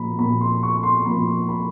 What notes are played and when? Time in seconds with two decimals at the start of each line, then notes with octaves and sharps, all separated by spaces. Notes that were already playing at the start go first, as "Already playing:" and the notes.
Already playing: A#2 F3 A#3 A#5 B5
0.19 A#2 F3 A#3 B5
0.41 C6
0.63 C#6
0.83 C6
1.06 A#2 F3 A#3 B5
1.49 B5